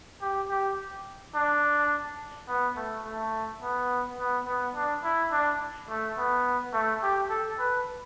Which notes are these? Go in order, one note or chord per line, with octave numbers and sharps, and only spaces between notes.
G4
G4
D4
B3
A3
A3
B3
B3
B3
D4
E4
D4
A3
B3
A3
G4
A4
B4